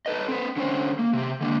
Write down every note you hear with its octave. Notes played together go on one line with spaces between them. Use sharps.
A4 B4 D#5
C4 B4
D3 C#4 C5
A#3
C3 G4
D3 A#3 D4